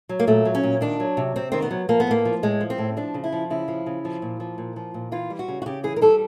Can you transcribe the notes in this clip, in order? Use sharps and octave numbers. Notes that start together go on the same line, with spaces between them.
F#3
A#3
A#2 A3
F#3
C#4
A#2
D#3 D4
F#3
C3
C3 C4
D#3 C4
B3
F#3
F3 A#3
B3
A2 A#3
F3
A2 G#3
F3
C4
A2
F3 D4
C#3
E4
F3
C#3 E4
F3
C#3
F3
A#2
F3
A#2
F3
A#2
E3 F4
G3
F#4
C#3
F#4
C#3 G4
E3 G#4
A#4
G3 A4